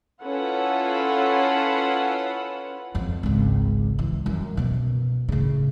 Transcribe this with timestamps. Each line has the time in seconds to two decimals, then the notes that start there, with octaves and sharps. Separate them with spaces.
0.22 C#4 E4 F4 A4 B4 F#5
2.95 F2
3.23 G#1 C#2
3.99 E3
4.26 F#2 G3
4.57 F#2 B2
5.28 A2 C#3